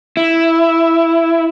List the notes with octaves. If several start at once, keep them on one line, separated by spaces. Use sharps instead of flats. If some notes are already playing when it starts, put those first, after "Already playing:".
E4